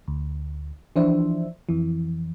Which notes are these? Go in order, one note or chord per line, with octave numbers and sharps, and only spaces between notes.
D2
E3 F3 D4 C5 E5
F2 E3